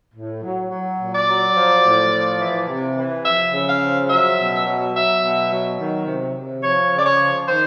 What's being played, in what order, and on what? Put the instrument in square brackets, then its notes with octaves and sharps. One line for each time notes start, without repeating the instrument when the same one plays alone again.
[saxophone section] A2
F#3
F#3
A#2
D5
F#3
F3
A2
F3
E3
C3
E3
F3 E5
C#3
F5
F3
F#3 E5
B2
F#3
F#3 E5
B2
F#3
D#3
C3
C3
F3 C#5
C#3
D5
C#5
F3
D#3 C5